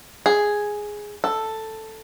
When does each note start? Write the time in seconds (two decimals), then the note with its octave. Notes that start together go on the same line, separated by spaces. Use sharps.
0.26 G#4
1.24 A4